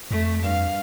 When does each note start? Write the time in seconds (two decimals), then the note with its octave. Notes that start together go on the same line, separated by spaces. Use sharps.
0.11 F2 A3
0.41 G2 F5